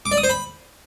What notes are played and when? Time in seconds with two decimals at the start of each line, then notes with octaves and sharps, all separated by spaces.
0.06 D6
0.12 D5
0.18 D#6
0.23 C5
0.29 B5